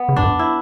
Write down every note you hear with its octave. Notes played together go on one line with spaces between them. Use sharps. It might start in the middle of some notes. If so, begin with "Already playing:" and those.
Already playing: B3
C#3
G2 D4
F#2
E4